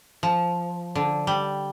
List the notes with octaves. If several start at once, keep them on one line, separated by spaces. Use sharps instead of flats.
F3
D3
G3